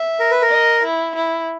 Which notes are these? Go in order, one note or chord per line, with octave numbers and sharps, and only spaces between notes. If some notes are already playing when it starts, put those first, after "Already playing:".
Already playing: E5
A#4
B4
A#4
D#5
E4
E4